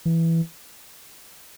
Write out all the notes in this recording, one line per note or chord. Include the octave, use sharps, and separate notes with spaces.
E3